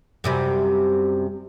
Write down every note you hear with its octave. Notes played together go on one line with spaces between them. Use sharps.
F#2 C3 G3